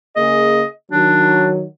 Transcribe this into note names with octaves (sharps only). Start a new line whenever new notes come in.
C#3 A#3 G#4 D#5
D#3 F#3 D4